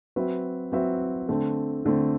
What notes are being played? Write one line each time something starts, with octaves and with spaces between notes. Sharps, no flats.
F#3 C4 F#4 B4 E5
F#3 C4 F#4 B4 E5
D3 A3 C4
D3 A3 C4